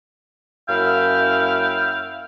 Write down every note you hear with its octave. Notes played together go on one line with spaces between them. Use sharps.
F#2 A#3 E4 F5 G5 F6